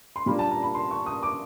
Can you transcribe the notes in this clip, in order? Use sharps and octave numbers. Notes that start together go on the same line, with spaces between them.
C6
A#2 G3 A#3 D4 B5
A5
A#5
B5
C6
C#6
D#6
D6